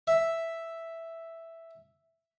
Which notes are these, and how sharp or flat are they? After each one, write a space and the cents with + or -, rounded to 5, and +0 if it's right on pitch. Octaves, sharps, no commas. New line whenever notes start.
E5 +0